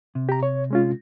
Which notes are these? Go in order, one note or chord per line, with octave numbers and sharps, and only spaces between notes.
C3
G4 A#5
C#5
G#3 C#4 F4